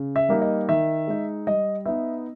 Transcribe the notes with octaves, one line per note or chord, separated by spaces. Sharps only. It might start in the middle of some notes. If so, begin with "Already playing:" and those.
Already playing: C#3
E5
G3 A#3 D#4
D#5
D#3 E5
G#3 D#4
G3 D#5
B3 D#4 E5